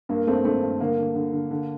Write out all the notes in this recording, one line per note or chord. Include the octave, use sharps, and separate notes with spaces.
G2 A#3
G2 A3 C4
G2 A3 C4
G2
D3 A#3
D3
D3
D3
D3